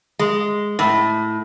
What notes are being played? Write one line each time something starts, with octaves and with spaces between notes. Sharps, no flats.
G#3
A2